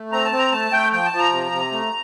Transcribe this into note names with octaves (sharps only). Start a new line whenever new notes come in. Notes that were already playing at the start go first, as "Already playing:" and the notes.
Already playing: A3
C4 A#5
A5
C4
A#5
A3 A5
A3 G5
F3 G5
A5
F3
A#5
C3
C3
A3